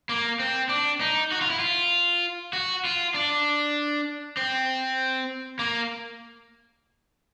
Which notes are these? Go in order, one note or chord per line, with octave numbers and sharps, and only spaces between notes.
A#3
C4
D4
D#4
F#4
F4
E4
F4
F#4
F4
D4
C4
A#3